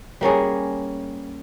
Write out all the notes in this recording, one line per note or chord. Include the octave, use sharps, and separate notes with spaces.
G3 A#3 C#4 G#4